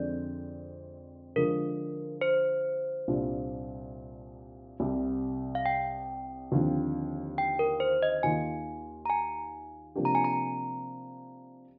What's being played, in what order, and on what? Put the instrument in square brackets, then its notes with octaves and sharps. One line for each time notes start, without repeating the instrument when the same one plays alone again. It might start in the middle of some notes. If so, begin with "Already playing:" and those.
Already playing: [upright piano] F2 D3 G#3 C4 [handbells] D5
[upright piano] D3 F3 G#3 [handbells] A#4
[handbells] C5
[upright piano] C2 A#2 G3 D4
C2 C3 G3
[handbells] F5
G5
[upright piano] D#2 D3 F3 C4
[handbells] G5
A#4
C5
D#5
[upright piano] D#2 D#3 A#3 F4 [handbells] G#5
[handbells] A#5
G#5
[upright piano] C3 F3 A#3 D4 G4
[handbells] A#5
G#5
A#5